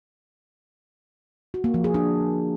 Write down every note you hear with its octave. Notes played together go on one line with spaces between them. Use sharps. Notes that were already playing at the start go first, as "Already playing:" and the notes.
F#4
A#3
F3
G#4
D4